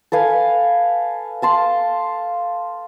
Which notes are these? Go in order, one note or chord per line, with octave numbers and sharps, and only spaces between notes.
A4 B4 F5 G#5
F5 A5 C6